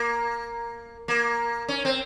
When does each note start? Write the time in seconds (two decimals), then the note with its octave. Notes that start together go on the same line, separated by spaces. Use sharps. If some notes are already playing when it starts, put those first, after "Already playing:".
Already playing: A#3
1.08 A#3
1.68 C#4
1.85 C4